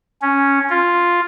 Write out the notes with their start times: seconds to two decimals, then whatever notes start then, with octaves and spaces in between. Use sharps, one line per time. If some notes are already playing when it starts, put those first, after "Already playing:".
0.22 C#4
0.70 F4